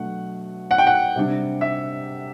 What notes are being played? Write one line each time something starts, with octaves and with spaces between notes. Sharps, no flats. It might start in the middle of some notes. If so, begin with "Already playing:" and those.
Already playing: B2 F#3 A3 D4 F#5
F#5
G5
F#5
C3 G3 D4
E5